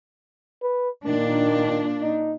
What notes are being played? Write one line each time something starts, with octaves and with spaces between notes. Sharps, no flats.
B4
A#2 D#3 D4
D#4